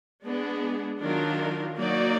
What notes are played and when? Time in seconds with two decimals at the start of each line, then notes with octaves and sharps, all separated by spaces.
0.24 G#3 B3 D4 G#4
1.00 D#3 F#3 D4 F4 A#4
1.78 F#3 A#3 D#4 F#4 D5